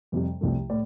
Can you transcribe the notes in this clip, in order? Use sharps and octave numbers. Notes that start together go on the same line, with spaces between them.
F2 C3 G3
C2 C3 F3 A3
A2 D5